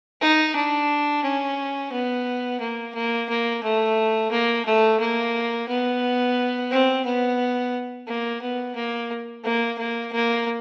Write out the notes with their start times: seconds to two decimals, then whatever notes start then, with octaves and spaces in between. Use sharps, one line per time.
0.21 D#4
0.56 D4
1.24 C#4
1.92 B3
2.60 A#3
2.95 A#3
3.29 A#3
3.63 A3
4.31 A#3
4.65 A3
5.00 A#3
5.68 B3
6.71 C4
7.05 B3
8.07 A#3
8.42 B3
8.75 A#3
9.45 A#3
9.78 A#3
10.12 A#3